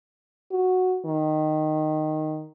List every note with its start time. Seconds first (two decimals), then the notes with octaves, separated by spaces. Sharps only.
0.51 F#4
1.05 D#3